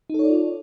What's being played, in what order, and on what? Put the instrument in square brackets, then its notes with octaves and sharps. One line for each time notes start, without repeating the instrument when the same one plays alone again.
[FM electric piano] D#4
A4
C#5
D5
F4